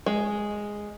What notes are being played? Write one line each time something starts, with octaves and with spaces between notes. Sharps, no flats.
G#3